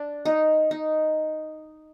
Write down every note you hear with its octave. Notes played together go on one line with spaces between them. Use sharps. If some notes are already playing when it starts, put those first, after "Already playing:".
Already playing: D4
D#4
D#4